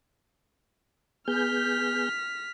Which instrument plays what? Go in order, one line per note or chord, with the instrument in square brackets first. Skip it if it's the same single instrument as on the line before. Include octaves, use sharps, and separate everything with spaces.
[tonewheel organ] B3 G#4 G6 [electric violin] F6 B6